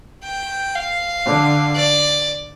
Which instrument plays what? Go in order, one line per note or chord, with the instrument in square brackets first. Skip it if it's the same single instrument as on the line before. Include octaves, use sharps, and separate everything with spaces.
[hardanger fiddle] G5
F5
[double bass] D3
[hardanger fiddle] D5